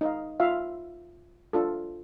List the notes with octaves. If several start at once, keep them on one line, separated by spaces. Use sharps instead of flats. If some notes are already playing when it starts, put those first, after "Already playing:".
D#4 D#5 F5
F4 E5 F5
D4 F4 A4